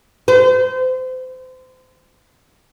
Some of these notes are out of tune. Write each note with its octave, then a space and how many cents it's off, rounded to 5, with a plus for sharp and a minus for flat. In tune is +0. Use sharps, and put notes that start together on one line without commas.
C5 -30